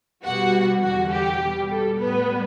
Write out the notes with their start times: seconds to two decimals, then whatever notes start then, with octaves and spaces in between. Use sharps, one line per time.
0.23 B2 G3 F#4 F#5
0.82 E2 D3 G3 F#4 F#5
1.11 G4
1.41 B2 G3
1.69 A4
1.98 A2 G3 B3 B4